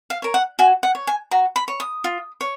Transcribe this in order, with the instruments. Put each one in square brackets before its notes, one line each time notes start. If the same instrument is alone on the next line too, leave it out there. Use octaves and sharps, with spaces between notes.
[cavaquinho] F5
A#4 C#5
F#5
F#4 G#5
F#5
C#5
G#5
F#4 A#5
B5
C#5
D#6
F4
C#5